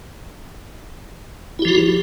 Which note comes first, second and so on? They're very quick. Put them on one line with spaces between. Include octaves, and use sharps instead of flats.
E4 G4 F3 F#4